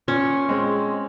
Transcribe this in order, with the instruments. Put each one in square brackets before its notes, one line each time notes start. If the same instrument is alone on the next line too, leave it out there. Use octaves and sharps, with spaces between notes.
[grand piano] A#2 [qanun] C#4
[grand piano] G#3 C4